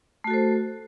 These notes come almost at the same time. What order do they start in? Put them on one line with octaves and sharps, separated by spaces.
A3 F#4 A4 C5